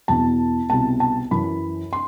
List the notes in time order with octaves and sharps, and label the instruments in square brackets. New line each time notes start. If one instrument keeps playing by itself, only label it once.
[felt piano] E2 B2 A5
C2 B2 A5
A5
F#2 E3 B5
C6